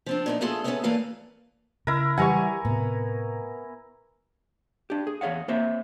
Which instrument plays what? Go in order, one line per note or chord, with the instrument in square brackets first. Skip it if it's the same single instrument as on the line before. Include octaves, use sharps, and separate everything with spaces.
[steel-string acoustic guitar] F3 C4 D4
A#2 B3 D#4
A3 B3 F4 G#4 A4
A3 B3 C#4 F#4 G#4 A4
A#2 E3 A3 A#3 B4 F5
[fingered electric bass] C#3 [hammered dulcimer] E4 A#4
[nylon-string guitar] E3 G3 F#5 [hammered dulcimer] G#5 A#5 C#6
[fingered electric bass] A2 C3 [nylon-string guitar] B3
[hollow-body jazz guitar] D4 G4
G#4
E2 G#4 C#5 F5 F#5
A#3 C4 C5 C#5 E5